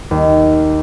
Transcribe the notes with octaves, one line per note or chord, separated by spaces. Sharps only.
D#2